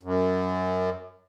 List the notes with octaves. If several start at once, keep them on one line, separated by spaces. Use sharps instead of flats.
F#2